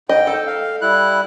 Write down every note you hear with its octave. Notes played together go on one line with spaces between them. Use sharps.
G#2 D#5 G5
A4
F5
G3 E4 F#6